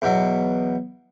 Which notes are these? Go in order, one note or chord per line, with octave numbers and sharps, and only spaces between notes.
E2 B2 F#3